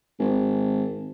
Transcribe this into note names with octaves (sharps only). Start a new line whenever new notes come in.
G#1